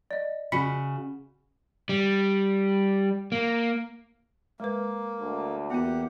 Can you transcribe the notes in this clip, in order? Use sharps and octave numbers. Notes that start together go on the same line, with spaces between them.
D5 D#5
C#3 F#4 B5 B6 C#7
G3
A#3
G#3 A#3 B4
D2
E2 E3 A#3 B3 F#4 G4 F#5